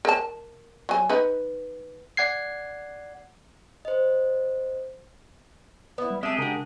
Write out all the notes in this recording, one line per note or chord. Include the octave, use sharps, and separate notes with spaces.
A#4 A5
F#3 G#5
D#4 B4
D5 F#5 G#6 C7
C5 D#5
B3 E4
G3
G#3 C4 G4 G#4 E5 A5 D#6
C#3 D4 F#4 A#4